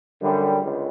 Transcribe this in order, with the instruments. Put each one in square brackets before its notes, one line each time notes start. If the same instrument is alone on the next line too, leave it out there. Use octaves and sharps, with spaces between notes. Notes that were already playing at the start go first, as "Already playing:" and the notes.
[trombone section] F#2 D3 G3
C#2